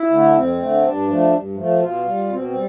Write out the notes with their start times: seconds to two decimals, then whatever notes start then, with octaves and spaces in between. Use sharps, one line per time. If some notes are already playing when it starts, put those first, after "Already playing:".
Already playing: E4
0.10 D3 A3
0.35 F2 C4
0.59 D3 A3
0.83 G2 D4
1.07 F3 A3
1.31 G2
1.56 F3 A3
1.80 B2 F4
2.05 G3
2.29 B2 C4
2.44 C4
2.53 G3